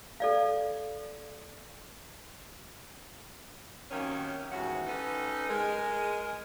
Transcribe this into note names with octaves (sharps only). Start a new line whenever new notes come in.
A4 D5 F5
C3 D#3 F#3 A#3 C#4
D#2 G#2 E3 C#4 F#4 F#5
C#4 D#4 G4 A4 B4
G#3 A#4